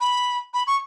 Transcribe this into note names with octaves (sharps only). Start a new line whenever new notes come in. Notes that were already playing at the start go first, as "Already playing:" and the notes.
B5
B5
C#6